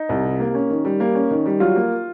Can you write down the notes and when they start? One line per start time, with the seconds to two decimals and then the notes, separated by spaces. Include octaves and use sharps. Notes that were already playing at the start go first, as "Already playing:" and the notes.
Already playing: D#4
0.09 C2
0.24 C3
0.40 A#3
0.54 C#4
0.70 D#3
0.85 G3
1.00 A#3
1.15 C#4
1.31 D#3
1.46 G3
1.60 F#3 F4
1.76 A#3